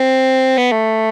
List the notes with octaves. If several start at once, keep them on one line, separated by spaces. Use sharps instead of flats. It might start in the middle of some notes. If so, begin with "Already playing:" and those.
Already playing: C4
B3
A3